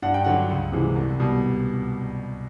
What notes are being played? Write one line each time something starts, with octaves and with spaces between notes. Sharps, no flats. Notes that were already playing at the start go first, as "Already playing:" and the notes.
G2 F#5
G5
D3 F#3 F#5
C#2
C3 E3 G#3
C2
B2 G3